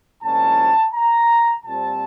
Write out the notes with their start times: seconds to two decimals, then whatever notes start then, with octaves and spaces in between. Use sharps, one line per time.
0.22 C2 A#2 F3 G#3 C#4 A5
0.94 A#5
1.65 A#2 G3 C4 A5